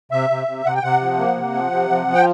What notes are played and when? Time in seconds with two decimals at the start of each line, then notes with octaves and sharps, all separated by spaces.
0.12 C3 E5
0.30 C3
0.47 C3
0.65 C3 F#5
0.74 G5
0.83 C3 F#5
1.01 F3
1.19 A#3
1.36 C3
1.54 F3
1.72 C3
1.90 F3
2.07 F3
2.15 G5